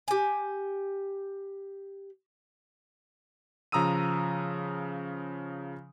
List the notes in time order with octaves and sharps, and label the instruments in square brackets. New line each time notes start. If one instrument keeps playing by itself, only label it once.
[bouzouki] G4 G#5
[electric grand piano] C#3 F3 A#5 D#6 E6 D#7